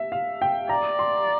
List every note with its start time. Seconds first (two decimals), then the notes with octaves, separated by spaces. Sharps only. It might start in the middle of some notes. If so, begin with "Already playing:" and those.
Already playing: E5
0.12 F5
0.42 G5
0.69 D5 A#5
0.99 C6